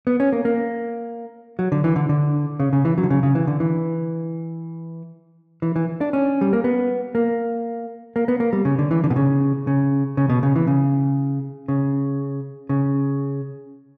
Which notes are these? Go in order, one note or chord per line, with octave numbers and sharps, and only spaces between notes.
B3
C#4
A#3
A#3
F#3
D3
E3
D3
D3
C#3
C#3
E3
F#3
D3
C#3
C#3
E3
D3
E3
E3
E3
D4
C#4
G3
A#3
B3
A#3
A#3
B3
A#3
G3
C#3
D3
E3
D3
B2
C#3
C#3
C#3
B2
C#3
E3
C#3
C#3
C#3